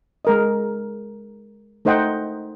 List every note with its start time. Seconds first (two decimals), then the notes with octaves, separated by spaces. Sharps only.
0.25 G#3 A#4 D#5
1.85 A3 D#4 C5 D#5 F#5 G5